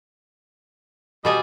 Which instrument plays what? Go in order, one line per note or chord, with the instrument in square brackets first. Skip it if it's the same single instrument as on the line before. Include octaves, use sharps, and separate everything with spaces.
[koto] B2 D5 G#5 [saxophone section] G3 G4 D#5